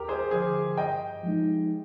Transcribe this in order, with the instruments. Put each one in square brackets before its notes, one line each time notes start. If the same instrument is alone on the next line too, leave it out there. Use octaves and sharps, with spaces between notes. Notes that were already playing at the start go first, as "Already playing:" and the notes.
Already playing: [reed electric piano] D#2 [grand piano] G4 A#4
[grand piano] G#4 C5
[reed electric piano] D3 F3 [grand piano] G#4 C5
[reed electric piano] G2 [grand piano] D#5 G5
[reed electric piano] F3 G#3 D#4